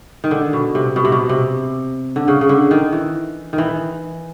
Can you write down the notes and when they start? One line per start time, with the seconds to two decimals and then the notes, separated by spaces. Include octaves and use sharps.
0.24 D#3
0.31 D3
0.53 B2
0.75 C3
0.96 B2
1.05 C3
1.12 B2
1.29 C3
2.16 D3
2.28 C#3
2.41 C#3
2.49 D3
2.71 D#3
2.92 E3
3.53 D#3
3.58 E3